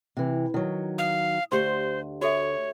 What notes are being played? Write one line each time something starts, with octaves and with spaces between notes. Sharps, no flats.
C3 E3
D#3 F#3 E4
F5 D#6
D2 G4 C5 C6
F#4 A4 C#5 E5